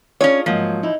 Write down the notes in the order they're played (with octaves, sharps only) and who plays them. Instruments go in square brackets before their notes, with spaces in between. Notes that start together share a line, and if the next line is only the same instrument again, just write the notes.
[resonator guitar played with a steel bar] C#4 C#5 [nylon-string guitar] D4 F4 G#4
[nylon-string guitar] G#2 F#3 A#3 [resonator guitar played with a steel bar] F3
[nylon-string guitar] D#4 E4